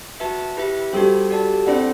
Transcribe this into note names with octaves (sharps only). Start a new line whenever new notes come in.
F#4 B4 E5 A5
E4 G4 B4 E5
G3 D4 F#4 G4 A4 C5
F#4 A4 D5 A5
C4 D4 E4 A4 C5 D5 F#5